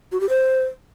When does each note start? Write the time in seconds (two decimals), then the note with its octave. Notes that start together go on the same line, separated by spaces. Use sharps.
0.12 F#4
0.21 G4
0.29 C5